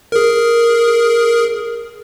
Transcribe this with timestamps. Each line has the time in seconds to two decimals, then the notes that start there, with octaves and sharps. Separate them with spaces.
0.12 G#4 A#4